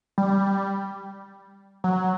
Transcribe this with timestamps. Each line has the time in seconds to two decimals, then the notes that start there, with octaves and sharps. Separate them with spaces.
0.18 G3
1.84 F#3